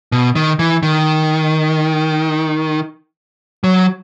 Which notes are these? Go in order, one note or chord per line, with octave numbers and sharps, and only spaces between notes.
B2
D#3
E3
D#3
F#3